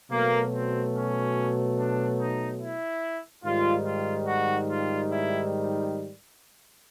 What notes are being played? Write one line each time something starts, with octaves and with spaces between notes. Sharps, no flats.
B2 F#3 A3 A#3
C4
C#4
D4
D#4
E4
G#2 D#3 G3 F4
F4
F#4
F4
E4